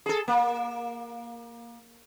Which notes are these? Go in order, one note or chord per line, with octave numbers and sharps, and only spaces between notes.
G#4 A4
A#3